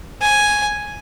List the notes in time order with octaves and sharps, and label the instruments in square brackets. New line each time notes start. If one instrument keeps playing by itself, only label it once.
[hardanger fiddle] G#5